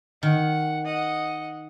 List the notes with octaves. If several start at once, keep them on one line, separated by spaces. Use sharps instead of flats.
D#3 F#5
D#5 F#5